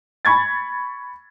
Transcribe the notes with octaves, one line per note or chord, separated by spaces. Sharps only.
B5 C#6 G#6 A6